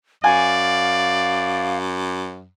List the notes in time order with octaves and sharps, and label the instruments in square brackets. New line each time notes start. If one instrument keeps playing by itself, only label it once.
[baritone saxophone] F#2 [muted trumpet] D5 [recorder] F5 [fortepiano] G#5